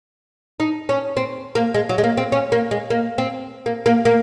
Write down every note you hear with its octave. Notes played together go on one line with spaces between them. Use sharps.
D#4
C#4
C4
A#3
G#3
F#3
G#3
A#3
C4
C#4
A#3
G#3
A#3
C4
A#3
A#3
A#3